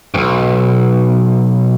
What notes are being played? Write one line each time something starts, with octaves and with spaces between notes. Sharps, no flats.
B1 G2